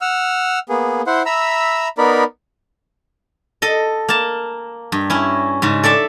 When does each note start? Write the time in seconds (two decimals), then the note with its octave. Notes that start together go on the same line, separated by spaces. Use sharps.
0.01 F#5 E6 F6
0.69 A#3 B3 G#4
1.07 E4 C5 F#5 C6
1.26 E5 A#5 B5 E6
1.98 B3 D#4 A#4 D5 B5
3.62 A4 D#5
4.08 A#3 A5
4.92 G2
5.10 C#4 E4
5.62 G#2 C#3
5.83 A4 D5 E5 A5